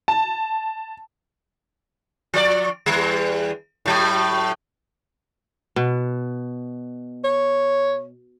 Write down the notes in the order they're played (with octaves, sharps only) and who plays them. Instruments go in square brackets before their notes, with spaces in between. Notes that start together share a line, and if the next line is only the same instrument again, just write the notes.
[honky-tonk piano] A5
[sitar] F3 D5
E2 G3
A2 F#3
[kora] B2
[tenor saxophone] C#5